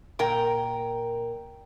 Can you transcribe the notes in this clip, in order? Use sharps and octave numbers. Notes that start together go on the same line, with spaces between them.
A#2 A#4 G5